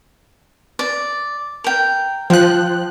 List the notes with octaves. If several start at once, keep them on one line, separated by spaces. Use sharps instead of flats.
D5
A#4 G5
F3 G5 F#6